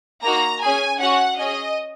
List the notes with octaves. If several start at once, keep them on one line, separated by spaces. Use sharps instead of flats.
A#3 D#4 F#4 A#5
C#4 G#4 G#5
C#4 F#4 F#5
C#4 G#4 D#5